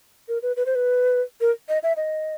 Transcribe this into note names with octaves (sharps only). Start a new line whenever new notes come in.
A#4
B4
B4
C5
B4
A#4
D#5
E5
D#5